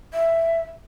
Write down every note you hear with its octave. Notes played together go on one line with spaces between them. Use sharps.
E5